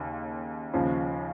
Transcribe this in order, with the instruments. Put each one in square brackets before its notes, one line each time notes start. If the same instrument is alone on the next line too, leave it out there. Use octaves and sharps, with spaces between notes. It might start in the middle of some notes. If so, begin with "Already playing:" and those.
Already playing: [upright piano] D#2 C#3
D#2 C#3 F3